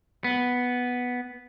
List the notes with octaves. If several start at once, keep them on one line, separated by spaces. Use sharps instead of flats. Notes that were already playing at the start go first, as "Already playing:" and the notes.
B3